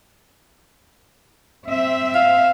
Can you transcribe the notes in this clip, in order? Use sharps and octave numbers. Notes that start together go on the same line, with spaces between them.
C4 E5
F5